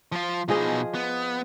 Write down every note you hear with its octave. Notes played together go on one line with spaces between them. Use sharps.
F3 F4
B2 F3 D#4 G#4 D#5
B3